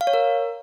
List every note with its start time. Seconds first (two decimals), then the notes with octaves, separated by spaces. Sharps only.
0.01 F5
0.07 C#5
0.14 A#4